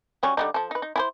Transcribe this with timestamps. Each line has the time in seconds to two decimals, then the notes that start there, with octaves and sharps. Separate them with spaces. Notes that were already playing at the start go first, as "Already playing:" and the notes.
0.23 F#3 G3 C#4
0.37 D3 G3 D#4
0.54 F3 A4
0.71 D#4 B4
0.82 D#4
0.96 E4 G#4 C5